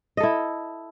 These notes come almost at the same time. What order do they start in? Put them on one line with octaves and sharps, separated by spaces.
D#5 A4 E4